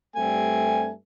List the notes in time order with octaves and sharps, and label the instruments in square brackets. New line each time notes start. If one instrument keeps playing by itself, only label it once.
[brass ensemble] G2 G3 A3 [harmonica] C4 G#5